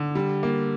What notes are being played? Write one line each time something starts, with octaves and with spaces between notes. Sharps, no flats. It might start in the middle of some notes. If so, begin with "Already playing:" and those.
Already playing: D3
G3
A#3